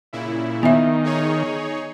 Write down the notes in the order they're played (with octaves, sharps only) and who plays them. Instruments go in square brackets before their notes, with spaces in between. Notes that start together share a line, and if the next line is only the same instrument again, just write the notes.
[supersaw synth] A#2 C#3 E4
[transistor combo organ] D#3 [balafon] B3 E5
[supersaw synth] D#4 G#4 C#5